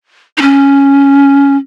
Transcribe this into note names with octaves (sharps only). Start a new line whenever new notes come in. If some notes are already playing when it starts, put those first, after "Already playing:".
D#4
C#4